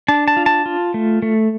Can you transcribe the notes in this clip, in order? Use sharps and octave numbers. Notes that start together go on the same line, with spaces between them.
D4 A5
A5
F4
A5
F4
A3
A3